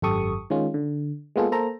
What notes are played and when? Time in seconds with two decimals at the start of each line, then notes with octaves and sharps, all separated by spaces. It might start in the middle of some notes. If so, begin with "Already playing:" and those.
0.02 G#1 F#2 G4 A4 C#6 D#6
0.50 D#3 G#3 C#4 F4
0.74 D3
1.36 G#3 A#3 B3 F4 G#4 A4
1.52 A#3 A4 C5 A#5